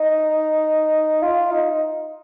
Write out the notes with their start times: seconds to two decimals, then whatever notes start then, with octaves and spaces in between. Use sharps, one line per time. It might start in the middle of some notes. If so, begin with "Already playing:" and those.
Already playing: D#4
1.22 F4
1.51 D#4